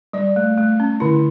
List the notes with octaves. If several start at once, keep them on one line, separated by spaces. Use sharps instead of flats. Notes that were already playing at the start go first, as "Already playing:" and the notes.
G3 D5
A3
A3
C#4
D3 E4